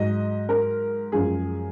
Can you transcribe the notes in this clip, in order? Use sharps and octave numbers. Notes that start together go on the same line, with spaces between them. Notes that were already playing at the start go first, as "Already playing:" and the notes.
Already playing: G#2 F#3 D#5
A#4
F#2 F3 G#3 G#4